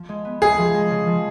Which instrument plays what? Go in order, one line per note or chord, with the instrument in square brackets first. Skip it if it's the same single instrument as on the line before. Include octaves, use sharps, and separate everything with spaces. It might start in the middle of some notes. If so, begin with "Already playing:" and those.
Already playing: [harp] F3
G#3
B3
[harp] C3 [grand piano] G#4
[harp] F3
G#3
C#3
F3